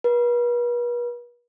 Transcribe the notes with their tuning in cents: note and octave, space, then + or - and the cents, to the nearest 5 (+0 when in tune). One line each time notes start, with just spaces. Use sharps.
B4 -40